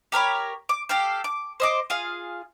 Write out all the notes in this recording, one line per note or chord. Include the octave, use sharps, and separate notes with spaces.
G4 A#4 C#5 B5
D6
G4 A4 F5 G5
D6
C5 D#5 D6
F4 G#4 F5